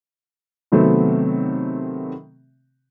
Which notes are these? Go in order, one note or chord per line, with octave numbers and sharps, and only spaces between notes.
C3 D#3 F#3 A3 B3 C4